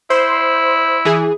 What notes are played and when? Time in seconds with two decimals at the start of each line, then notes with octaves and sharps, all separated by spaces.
0.10 E4 C5
1.05 E3 G#4